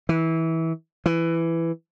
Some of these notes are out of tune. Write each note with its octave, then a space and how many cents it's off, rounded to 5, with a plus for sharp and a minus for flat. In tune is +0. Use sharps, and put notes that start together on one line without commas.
E3 -20
E3 +10